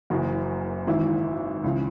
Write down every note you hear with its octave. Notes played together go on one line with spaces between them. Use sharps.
F#1 F#2 C#3 E3 F#4
G#1 G#2 E3 E4
C#2 C#3 E3